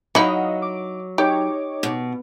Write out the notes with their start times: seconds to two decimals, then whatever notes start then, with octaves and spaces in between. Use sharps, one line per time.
0.15 F#3 D#4 E4 D#5 F5 F#5
0.62 D6
1.18 D#4 G4 C#5 D6
1.83 B2